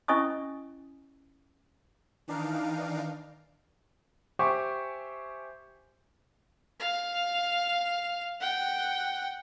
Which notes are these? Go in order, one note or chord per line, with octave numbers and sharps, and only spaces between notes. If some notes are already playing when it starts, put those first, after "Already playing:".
C#4 E4 D#5 G#5 C#6 D#6
D#3 E3 D4 D#4 F5 D7
G4 C5 E5 G#5 C#6 D6
F5
F#5 G5